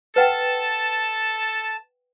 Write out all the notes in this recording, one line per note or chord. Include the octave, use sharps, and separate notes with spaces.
A4 B4 F#5 G5 A5